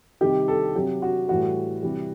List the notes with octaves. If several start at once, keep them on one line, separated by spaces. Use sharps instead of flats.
C3 D#3 G3 G4
A4
C3 F#3 G4
F#4
A2 E3 G3 F#4
C3 E3 G3